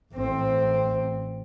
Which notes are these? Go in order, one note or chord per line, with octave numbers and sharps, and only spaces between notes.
A1 C4